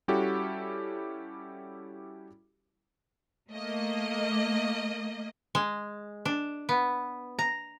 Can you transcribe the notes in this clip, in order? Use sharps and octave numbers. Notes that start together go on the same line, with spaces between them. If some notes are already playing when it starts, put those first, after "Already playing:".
G3 C#4 E4 F#4 G4 A4
A3 A#3 D#5
G#3
D4
B3
A#5